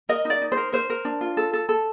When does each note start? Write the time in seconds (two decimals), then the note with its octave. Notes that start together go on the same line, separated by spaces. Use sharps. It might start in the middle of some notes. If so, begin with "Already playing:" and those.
0.09 A#4 D#5
0.25 D#4 D5
0.41 D#4
0.52 C5
0.57 A#4
0.72 A#4 C5
0.90 A#4
1.05 D4
1.21 F4
1.37 A4
1.53 A4
1.69 A4